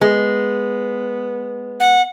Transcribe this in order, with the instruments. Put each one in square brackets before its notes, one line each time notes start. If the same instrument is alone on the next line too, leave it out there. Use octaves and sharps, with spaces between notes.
[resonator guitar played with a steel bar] G#3 [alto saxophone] B3
[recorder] F#5